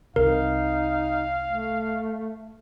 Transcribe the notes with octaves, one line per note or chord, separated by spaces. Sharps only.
C2 C3 D#4 A#4 F5
A3